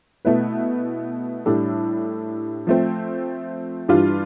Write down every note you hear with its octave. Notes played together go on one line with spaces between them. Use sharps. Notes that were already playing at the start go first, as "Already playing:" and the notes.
B2 A3 E4 B4
A2 G3 D4 A4
F3 A3 C4
G2 E3 G3 D4 F4